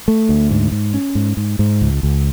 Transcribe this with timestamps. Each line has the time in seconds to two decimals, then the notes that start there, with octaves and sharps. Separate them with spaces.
0.08 A3
0.29 D2
0.50 G#2
0.72 G#2
0.94 C#4
1.15 G#2
1.37 G#2
1.59 G#2
1.81 C#2
2.03 C#2